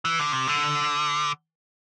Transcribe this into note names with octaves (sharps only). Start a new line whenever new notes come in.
E3
D3
C3
D3